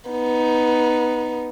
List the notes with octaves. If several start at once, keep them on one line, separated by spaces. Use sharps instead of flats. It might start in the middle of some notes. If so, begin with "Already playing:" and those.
B3 D#4